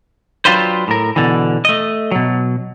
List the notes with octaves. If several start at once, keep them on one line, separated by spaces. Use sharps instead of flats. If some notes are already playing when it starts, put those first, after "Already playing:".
F#3 D4 F4 G4 B4 C5
A2 A#4
B2 D3 E3
A3 D#5
B2 F#3